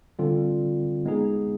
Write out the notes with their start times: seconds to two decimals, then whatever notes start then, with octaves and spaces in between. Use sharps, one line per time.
0.19 D3 G3 C4 F4
1.06 G#3 B3 D#4 G#4